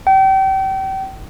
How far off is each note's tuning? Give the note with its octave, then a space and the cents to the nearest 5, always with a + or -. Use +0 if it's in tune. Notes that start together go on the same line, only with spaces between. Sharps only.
G5 -30